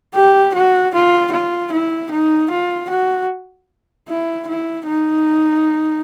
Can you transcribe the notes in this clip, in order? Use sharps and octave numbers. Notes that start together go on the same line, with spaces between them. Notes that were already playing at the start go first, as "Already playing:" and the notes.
G4
F#4
F4
F4
E4
D#4
F4
F#4
E4
E4
D#4